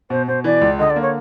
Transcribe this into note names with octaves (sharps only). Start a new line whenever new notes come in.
B2 C5
B2 C5
E3 D5
C#2
D3 D#5
D5
A#3
C#5